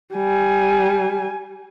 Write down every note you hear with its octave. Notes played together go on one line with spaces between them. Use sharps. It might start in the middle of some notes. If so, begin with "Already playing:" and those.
G3 G#5